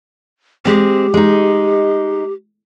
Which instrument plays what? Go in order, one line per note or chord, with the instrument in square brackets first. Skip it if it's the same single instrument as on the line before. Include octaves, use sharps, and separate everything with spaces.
[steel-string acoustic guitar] G#3 C4 [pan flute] G4
[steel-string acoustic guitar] G#3 D#4